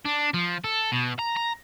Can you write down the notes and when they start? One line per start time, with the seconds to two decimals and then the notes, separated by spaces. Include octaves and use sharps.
0.05 D4
0.34 F3
0.64 A4
0.92 B2
1.19 A#5
1.37 A#5